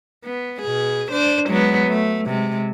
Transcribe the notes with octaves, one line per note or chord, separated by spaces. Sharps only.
B3
B2 G#4
D4 C5
F#3 G#3 B3
A3
C3 G#3